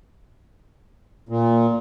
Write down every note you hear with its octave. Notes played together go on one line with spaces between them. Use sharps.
A#2